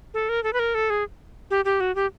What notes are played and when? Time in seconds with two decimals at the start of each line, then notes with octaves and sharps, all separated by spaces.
0.14 A4
0.29 A#4
0.44 A4
0.53 B4
0.59 A#4
0.75 A4
0.90 G#4
1.51 G4
1.65 G4
1.80 F#4
1.95 G4